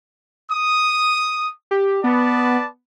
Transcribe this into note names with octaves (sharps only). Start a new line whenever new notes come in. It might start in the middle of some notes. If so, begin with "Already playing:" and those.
D#6
G4
B3 B4 D5 A5